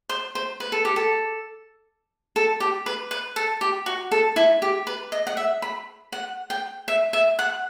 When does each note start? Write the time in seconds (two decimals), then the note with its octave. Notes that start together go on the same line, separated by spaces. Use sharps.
0.09 C5
0.35 C5
0.60 B4
0.72 A4
0.85 G4
0.96 A4
2.36 A4
2.60 G4
2.86 B4
3.11 B4
3.36 A4
3.61 G4
3.86 F#4
4.12 A4
4.36 E4
4.62 G4
4.87 B4
5.12 D#5
5.27 F#5
5.37 E5
5.62 B5
6.12 F#5
6.50 G5
6.88 E5
7.13 E5
7.39 F#5